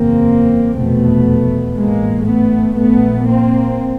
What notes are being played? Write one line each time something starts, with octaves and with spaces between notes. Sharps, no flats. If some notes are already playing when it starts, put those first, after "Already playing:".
Already playing: F#1 E2 C#3 A#3 C4
F1 E2 B2 A3 B3
A1 G#2 G#3 A#3
A3 B3
A#1 A#2 A3 B3
A#3 C4